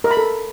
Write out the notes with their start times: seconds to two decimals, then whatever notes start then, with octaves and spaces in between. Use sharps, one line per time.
0.04 A#4
0.11 B5
0.17 A4